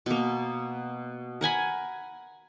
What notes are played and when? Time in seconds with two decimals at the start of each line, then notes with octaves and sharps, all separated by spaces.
0.06 B2 A#3
1.41 A#4 F#5 G#5 B5